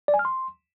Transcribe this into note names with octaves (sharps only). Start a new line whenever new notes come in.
D5
G#5
F6
C6